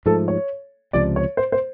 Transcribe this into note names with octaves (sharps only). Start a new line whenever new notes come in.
G#2 F3 A3 A4
C#5
C#2 C3 F3 D5
C#5
C5
C5